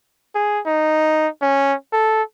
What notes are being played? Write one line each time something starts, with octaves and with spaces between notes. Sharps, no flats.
G#4
D#4
C#4
A4